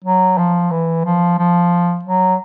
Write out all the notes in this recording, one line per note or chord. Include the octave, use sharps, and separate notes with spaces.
F#3
F3
E3
F3
F3
F#3